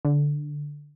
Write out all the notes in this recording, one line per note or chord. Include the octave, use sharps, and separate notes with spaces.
D3